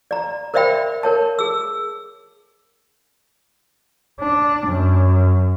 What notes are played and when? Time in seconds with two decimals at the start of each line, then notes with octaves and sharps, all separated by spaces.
0.11 D5 A#5
0.54 A#4 C5 D5 E5 G5 B5
1.03 A#4 C#5 A5
1.39 G#4 E6
4.21 D4
4.67 F#2